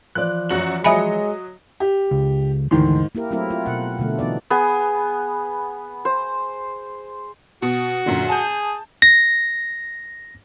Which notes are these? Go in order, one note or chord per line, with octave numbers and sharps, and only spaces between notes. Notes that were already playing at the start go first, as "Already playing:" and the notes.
E3 F3 D5 F#6
F#2 F#4 F#7
F#3 G#3 D#5 E5 G#5 B5 C#7
G4
C#2
D2 G#2 D#3 E3 C6
A#3 E4 G4 A#4
F#3 A3 C4 E4 A#4
F4
B2 F#5
B2 D3 A3
E3 B3 D#4 D5
B3 G#4
C5
B2 F#4
F#2 A#2 D3
G#4 A5 G6
A#6